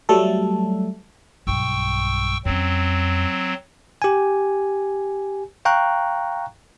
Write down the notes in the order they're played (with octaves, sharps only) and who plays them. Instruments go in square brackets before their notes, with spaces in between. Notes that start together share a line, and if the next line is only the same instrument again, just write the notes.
[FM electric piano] F#3 G3 A3 A4
[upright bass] B1 G2 [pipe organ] G5 C#6 E6
[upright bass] F2 C#4 [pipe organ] F#3 C4
[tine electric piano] G4 G#5
F5 G5 A#5 C#6 F#6